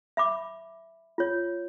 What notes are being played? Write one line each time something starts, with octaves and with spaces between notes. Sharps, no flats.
E5 B5 D6
F4 C#5